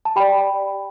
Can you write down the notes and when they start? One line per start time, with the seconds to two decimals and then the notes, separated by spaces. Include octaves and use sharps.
0.05 A5
0.16 G4 D5 G5 B5